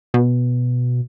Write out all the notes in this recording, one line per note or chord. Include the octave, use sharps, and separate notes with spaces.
B2